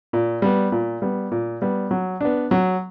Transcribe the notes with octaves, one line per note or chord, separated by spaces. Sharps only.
A#2
G3 B3
A#2
G3 B3
A#2
G3 B3
F#3
B3 D4
F#3